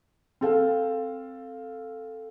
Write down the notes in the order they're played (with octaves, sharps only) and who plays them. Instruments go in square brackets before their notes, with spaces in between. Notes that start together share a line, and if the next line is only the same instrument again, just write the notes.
[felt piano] C4 A4 F5